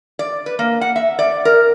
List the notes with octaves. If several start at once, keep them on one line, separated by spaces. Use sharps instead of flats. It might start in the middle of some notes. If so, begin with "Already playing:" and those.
D5
B4
A#3
F#5
E5
D5
A#4